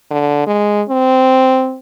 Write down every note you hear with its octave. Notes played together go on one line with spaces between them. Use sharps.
D3
G#3
C4